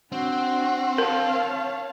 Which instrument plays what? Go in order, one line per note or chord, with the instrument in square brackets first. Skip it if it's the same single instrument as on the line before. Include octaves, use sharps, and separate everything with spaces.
[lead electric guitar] C4 [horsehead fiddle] D4 [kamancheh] F#4
[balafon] A#4 [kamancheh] C#5 A5 [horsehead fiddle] F5